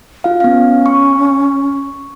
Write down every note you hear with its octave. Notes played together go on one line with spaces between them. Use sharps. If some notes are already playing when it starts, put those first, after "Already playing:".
F4 F5
B3 C#4 F5
C#6